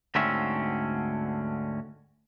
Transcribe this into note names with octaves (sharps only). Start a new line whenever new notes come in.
D2 G#2 D3 C4 C#4 E5